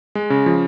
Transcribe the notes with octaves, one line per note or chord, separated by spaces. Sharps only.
G#3
C#3
F3